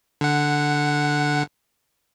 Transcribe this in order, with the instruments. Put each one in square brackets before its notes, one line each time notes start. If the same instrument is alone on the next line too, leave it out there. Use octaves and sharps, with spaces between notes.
[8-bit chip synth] D3 F#5